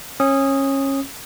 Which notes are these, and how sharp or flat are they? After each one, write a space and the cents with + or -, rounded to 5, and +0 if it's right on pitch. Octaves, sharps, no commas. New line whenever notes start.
C#4 -25 D#6 +0